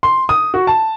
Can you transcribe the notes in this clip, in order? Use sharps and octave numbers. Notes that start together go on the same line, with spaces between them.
C6
D#6
F#4
A5